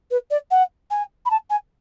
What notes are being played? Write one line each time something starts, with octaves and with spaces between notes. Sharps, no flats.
B4
D5
F#5
G#5
B5
A5
G#5